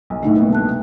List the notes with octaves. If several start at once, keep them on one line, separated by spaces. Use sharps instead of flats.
B1
A2 D3 A3 A#3 D#4
C2 B2 B3
A5 F#6